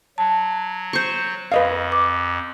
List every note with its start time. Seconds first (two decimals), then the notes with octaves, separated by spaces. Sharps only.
0.18 F#3 A5
0.93 C5 C#6
1.52 F2 B4 D#5 F5
1.92 D6